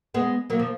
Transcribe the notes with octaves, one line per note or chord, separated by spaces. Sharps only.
G#3 B3
F#3 A#3
F3